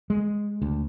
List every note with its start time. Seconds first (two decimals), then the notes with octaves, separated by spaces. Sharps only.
0.10 G#3
0.62 D2